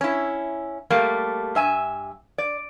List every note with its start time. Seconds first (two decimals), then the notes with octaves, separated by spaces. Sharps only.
0.01 C#4 E4
0.90 G3 A3 A#3
1.55 G2 E5 G#5
2.38 D5